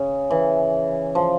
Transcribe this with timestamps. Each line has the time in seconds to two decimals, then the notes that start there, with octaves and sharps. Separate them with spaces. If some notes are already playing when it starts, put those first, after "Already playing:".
Already playing: C#3
0.30 E3
1.15 F3